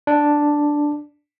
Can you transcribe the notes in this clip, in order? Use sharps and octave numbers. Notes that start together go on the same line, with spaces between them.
D4